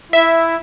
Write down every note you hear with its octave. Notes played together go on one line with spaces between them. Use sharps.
E4 E5